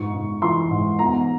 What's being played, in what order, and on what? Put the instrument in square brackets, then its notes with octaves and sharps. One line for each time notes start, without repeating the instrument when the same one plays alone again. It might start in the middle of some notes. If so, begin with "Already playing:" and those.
Already playing: [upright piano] G#2 C#6
G#2
E3 C6
G#2
E2 A#5